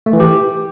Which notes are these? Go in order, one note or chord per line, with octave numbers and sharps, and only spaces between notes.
A3
E3
G4